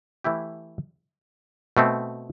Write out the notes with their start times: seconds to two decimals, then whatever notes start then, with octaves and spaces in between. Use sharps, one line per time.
0.24 E3 A3 E4 G4
1.77 B2 A3 C4